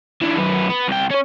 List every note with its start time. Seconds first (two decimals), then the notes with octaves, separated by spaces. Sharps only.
0.22 D3 E3
0.37 F#2 B3
0.70 B3
0.88 C2 G5
1.11 C#4 C#5